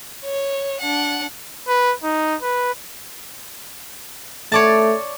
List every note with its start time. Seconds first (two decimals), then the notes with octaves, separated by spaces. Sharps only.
0.24 C#5
0.80 D4 F#5
1.67 B4
2.03 D#4
2.43 B4
4.52 A3 C#5 D5 A5